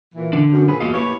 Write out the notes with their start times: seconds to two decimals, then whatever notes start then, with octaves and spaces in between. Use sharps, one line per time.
0.15 A#2 E3
0.33 D3 D4
0.52 F#2
0.68 A#2 C4 G#4 B4
0.80 E2 A#3 F4 F#4 D#5 F5
0.94 A#3 E4 G4 B4 C#5